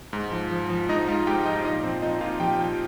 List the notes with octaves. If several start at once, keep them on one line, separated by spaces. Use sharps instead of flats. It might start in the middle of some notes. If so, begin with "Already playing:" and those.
G#2
F3
F3
F3
G#2 D#4 D#5
G#2 F4 F5
G#2 G4 G5
F3 D#4 D#5
A#2 D#4 D#5
F3 C4 C5
F3 D#4 D#5
A#2 F4 F5
F3 G4 G5
F3